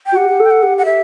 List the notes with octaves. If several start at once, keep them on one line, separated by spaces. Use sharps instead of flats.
G5
F#4
G4 F#5
G4
A4
G5
F#5
G4
F#5
G4 E5